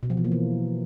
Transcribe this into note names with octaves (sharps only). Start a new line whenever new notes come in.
B2
F3
E3
A#3
E3